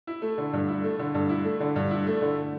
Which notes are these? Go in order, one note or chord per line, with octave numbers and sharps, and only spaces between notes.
E4
A3
D3
G2
E4
A3
D3
G2
E4
A3
D3
G2
E4
A3
D3